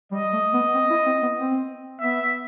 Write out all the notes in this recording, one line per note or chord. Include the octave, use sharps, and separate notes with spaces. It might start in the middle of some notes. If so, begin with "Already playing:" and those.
G3 D#5
A3
B3
C4
E4
C4
B3
C4
B3 E5